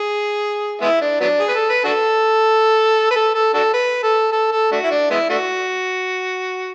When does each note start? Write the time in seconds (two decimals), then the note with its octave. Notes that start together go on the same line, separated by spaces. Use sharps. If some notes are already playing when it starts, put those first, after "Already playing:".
Already playing: G#4
0.81 G#3 B3 E4
1.01 D4
1.20 F#3 B3 D4
1.40 G#4
1.48 B4
1.55 A4
1.69 B4
1.84 D4 F#4 A4
3.11 B4
3.16 A4
3.35 A4
3.54 D4 F#4 A4
3.74 B4
4.03 A4
4.32 A4
4.52 A4
4.72 A3 D4 F#4
4.83 E4
4.91 D4
5.10 G#3 B3 E4
5.29 A3 D4 F#4